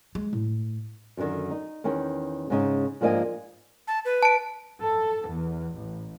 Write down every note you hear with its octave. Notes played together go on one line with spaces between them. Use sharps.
G#3
A2
F#2 B2 D3 D#3
D#4
E2 D#3 C#4 G5
G#2 C#3 D#4
G#2 F3 A#3 D4 D#5 G#5
A5
B4
A5 D7
A4
E2
A1